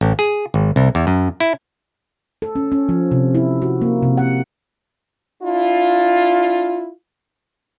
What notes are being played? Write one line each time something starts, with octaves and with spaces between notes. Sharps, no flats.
A1
G#4
G#1
C2
E2
F#2
E4
A4
C#4
C#4
F3
C3
E4
F#4
A#3
C3
F#5
D4 E4 F4